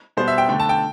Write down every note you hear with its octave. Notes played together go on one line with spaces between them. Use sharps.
B2 G3 B3 C5
E5
G5
D3 A3 G5
A5
G5